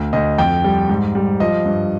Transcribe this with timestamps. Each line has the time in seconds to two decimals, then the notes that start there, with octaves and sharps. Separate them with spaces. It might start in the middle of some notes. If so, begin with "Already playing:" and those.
Already playing: D2
0.13 D2 D#5
0.38 F2 G5
0.64 G3
0.89 G#2
1.15 G3
1.40 F3 D#5
1.66 G2